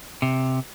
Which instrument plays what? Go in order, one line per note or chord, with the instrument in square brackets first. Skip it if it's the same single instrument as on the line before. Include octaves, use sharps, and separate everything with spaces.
[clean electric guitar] C3